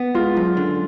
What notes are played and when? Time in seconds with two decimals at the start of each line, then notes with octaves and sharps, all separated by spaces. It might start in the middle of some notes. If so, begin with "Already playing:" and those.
Already playing: B3
0.15 G#3 F4
0.37 F#2
0.57 D3